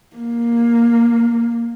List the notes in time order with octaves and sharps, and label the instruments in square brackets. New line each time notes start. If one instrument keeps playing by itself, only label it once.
[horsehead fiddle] A#3